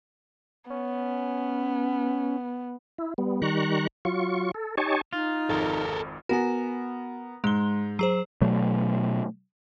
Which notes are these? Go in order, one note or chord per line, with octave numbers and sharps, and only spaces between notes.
B3 C#4
E4
G3 B3
D#3 G3 A#5 C#6 F#6
F#3 F4 C#6
A4
D#4 G4 C#5 G#5 A5 C#6
D#4 F4
G#1 F2 G#2 A4 A#4
B3 F#4 A#4 G#5
G#2 G#3 G7
F#3 G#4 C5
B2 F#3 A3